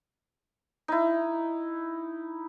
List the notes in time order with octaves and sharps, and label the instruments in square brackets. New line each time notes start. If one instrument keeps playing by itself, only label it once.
[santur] D#4 E4